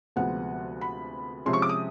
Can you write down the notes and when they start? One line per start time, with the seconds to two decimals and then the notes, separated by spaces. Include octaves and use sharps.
0.16 D2 C3 F3 G#3 B3 F#5
0.81 B5
1.46 C3 F3 G#3 C#4 C6
1.53 C#6
1.62 D6
1.69 D#6